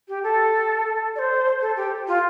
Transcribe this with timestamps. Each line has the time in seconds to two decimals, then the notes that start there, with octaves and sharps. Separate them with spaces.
0.08 G4
0.24 A4
1.16 D5
1.19 C5
1.61 A4
1.76 G4
2.08 F4